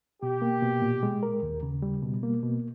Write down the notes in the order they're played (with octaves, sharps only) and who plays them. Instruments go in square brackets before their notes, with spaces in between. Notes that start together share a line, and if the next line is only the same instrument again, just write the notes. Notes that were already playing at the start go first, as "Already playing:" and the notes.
[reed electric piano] B2 [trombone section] G4
[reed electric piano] A#3
B2
A#2
G#3
A#4
D#2
C#3
G3
B2
A#3
B2